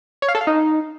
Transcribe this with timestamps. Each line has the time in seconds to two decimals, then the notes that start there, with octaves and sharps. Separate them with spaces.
0.22 C#5
0.28 F5
0.35 A4
0.41 F5
0.47 D#4